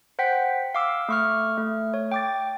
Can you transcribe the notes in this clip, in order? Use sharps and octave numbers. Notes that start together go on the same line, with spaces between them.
C5 F#5 G5 B6
F5 D6 E6
A3 C#6 F6
A3
C#5
G5 D6 A6